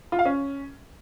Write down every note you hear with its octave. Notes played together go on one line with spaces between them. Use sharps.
F4
F5
C#4